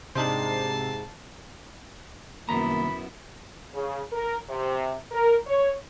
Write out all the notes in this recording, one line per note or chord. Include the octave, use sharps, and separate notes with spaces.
G#2 C3 D4 D#4 C5 A5 C7
C2 F#2 D#3 A#3 B3 E4 A#5 B5
C#3
A#4
C3
A#4
C#5